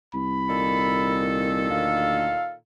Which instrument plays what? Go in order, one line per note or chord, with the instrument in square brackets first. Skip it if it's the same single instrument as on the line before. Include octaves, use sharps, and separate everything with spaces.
[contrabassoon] C2 [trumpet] B5
[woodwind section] A#2 D#3 A4
[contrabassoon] D2 [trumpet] F5